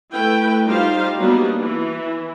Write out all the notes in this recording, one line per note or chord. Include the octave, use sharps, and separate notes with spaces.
A3 E4 B4 G5
G3 D#4 F4 G4 C5 F5
F#3 G3 A#3 B3 D4 D#4
E3